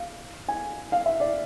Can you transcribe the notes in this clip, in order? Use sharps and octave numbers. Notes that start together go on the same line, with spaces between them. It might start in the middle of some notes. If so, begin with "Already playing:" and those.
Already playing: F5
G#5
F5
E5
D5